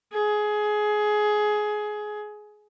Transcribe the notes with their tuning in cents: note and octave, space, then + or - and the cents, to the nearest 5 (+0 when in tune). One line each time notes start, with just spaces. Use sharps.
G#4 +20